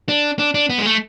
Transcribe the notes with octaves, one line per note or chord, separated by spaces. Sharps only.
D4
D4
D4
B3
G#3
A3